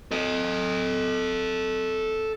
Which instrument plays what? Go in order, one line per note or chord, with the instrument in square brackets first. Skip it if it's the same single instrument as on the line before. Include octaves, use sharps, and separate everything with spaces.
[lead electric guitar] A4 D#5